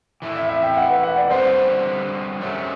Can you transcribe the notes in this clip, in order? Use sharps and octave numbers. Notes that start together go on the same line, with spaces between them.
E3 A3 E4
E5
E5
G5
F#5
B4
F#5
D5
D3 G3 C4 F#4 B4 C5
F#2 F#3 A3